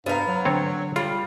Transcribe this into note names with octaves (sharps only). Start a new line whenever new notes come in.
G2 B3 C5 F5 A#5
F#3
D3 C4 C#5
G3 F4